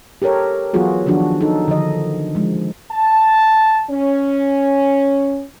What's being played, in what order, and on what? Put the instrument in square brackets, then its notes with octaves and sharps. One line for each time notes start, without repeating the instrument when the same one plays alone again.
[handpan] G4 A4 A#4 C#5
E3 F#3 B3 F4 F#4 G#4
D#3 F3 F#3 D4 F#4
D#4 A4
D3 D#3 F3 D#5
F3 G#3
[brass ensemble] A5
C#4